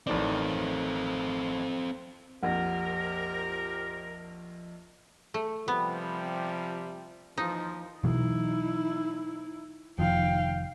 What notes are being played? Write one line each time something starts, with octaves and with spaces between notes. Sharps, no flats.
A1 D#3 C4 A4 D5
A#1 F2 C4 G4 A#4 F#5
A3
C3 F3 G3 B3
D#2 E3 F3 D#4
B2 E3 F#3 D#4 E4
F1 D#3 F3 F5 G5